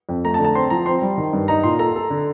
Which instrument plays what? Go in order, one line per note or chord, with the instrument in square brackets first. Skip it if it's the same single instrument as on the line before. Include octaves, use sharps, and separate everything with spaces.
[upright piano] F2
[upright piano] A3 [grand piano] A#5
[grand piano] A5
[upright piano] D3
[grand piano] A5
[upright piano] C4 [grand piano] C6
[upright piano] F3 [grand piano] A#5
[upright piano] C4 [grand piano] C6
[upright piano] G3
D#3
G2
[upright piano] D#4 [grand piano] A#5
[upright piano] A#2 [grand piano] C6
[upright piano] A4 [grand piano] A#5
[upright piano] A4
D3